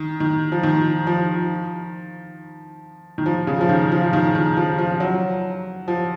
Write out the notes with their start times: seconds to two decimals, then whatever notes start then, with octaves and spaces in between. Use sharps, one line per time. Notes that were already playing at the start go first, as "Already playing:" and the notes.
Already playing: D#3
0.20 D#3
0.52 F3
0.63 D#3
1.07 F3
3.18 D#3
3.26 F3
3.47 C#3
3.61 F3
3.69 D#3
3.92 F3
4.03 F3
4.13 D#3
4.35 D#3
4.57 F3
4.78 F3
5.00 F#3
5.88 F3